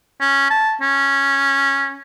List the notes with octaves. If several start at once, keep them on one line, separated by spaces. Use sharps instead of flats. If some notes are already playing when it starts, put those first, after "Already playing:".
C#4
A5
C#4